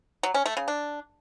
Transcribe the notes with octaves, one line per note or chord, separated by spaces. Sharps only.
F#3
C#4
A3
C#3
D4